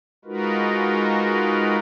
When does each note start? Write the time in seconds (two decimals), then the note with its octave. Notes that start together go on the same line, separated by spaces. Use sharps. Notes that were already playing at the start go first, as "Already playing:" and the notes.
0.25 G#3 D#4 F4 F#4 A#4 B4